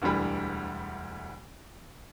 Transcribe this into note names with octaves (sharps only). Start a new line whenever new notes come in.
E1 D2 D3 E3 G3 B5